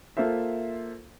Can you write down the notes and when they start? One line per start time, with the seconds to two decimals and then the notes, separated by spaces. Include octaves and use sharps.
0.17 A#3 F4 A4 C5 E5